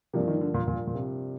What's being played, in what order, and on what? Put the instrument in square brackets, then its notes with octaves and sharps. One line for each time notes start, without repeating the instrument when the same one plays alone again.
[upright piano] G2 F3 A#3 [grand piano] C3
[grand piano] D#3
D3
A#2
A#2
A#2
C3